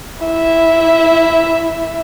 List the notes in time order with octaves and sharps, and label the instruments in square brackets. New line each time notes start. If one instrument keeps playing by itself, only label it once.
[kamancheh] E4 E5